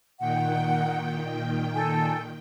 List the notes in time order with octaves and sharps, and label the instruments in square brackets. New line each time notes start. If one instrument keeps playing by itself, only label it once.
[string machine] A#2 D#3 G5 [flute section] F#5
[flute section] A4 G#5